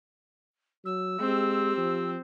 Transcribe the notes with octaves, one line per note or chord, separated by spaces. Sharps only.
F#3 E6
G#3 C4 G4
F3